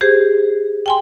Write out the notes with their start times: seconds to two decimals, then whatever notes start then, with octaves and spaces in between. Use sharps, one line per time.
0.01 G4 G#4 C5
0.86 G5 G#5 C6